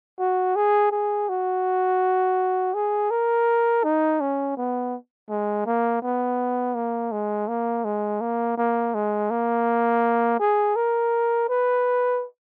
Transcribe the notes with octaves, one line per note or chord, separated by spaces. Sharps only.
F#4
G#4
G#4
F#4
G#4
A#4
D#4
C#4
B3
G#3
A#3
B3
A#3
G#3
A#3
G#3
A#3
A#3
G#3
A#3
G#4
A#4
B4